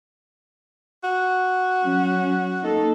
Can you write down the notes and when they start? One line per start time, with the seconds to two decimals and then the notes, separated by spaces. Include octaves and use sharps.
1.04 F#4
1.83 F#3 C#4
2.62 A#3 D#4 A4